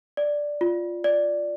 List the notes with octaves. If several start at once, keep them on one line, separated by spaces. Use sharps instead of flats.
D5
F4
D5